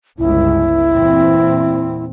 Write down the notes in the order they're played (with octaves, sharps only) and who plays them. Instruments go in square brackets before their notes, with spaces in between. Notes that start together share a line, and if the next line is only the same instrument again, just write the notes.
[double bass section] G1 C#2 [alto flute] E4
[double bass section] E2 A#2 C4